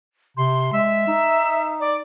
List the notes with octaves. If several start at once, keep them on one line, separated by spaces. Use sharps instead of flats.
C3 C6
G#3 E5
D#4
D5